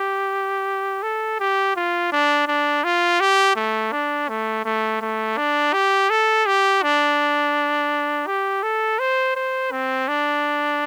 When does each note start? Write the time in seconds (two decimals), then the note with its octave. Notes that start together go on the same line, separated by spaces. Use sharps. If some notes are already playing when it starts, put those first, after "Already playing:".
Already playing: G4
1.03 A4
1.40 G4
1.76 F4
2.12 D4
2.48 D4
2.84 F4
3.20 G4
3.56 A3
3.92 D4
4.29 A3
4.65 A3
5.01 A3
5.37 D4
5.73 G4
6.10 A4
6.46 G4
6.83 D4
8.27 G4
8.63 A4
8.99 C5
9.36 C5
9.72 C4
10.08 D4